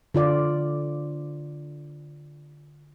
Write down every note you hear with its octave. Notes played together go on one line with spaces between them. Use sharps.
D3 F4 D5